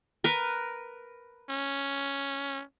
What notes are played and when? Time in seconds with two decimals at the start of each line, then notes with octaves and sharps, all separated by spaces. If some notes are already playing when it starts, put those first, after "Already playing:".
0.24 A#4 B4
1.50 C#4